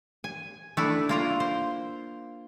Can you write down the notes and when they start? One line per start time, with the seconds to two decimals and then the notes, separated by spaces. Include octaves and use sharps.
0.24 G#5
0.77 A3 D4 E4
1.09 A#3 F4 A#4
1.40 C5